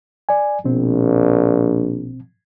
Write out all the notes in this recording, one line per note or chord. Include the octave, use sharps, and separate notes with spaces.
D5 G#5
A#1 B2 C4